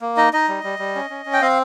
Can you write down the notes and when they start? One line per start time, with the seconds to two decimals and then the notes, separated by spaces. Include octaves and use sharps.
0.01 A#3
0.17 D#4 D#5
0.33 D#4 D#5
0.48 G3
0.64 G3
0.79 G3
0.95 C#4
1.10 C#4
1.26 C#4
1.33 G5
1.41 C4 F5